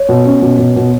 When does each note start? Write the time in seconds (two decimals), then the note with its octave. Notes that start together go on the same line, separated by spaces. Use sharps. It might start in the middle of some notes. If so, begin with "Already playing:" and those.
Already playing: C#5
0.09 B2
0.26 C#4
0.42 B2
0.59 B2
0.76 B2